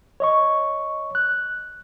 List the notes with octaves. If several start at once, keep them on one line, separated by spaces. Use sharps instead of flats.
C#5 D#5 C#6
F#6